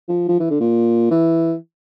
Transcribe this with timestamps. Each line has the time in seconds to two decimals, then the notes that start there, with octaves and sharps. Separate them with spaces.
0.08 F3
0.28 F3
0.40 E3
0.50 D3
0.60 A#2
1.11 E3